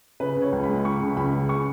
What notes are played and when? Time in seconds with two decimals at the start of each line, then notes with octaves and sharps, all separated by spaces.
0.20 C#3 B4
0.36 C#3
0.42 C#5
0.52 C#2
0.63 B5
0.69 G#3
0.85 C#3 C#6
1.01 C#3
1.17 C#2 B5
1.33 C#3
1.49 C#3 C#6